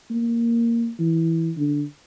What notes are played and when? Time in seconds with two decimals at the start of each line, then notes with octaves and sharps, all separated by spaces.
0.11 A#3
0.99 E3
1.57 D3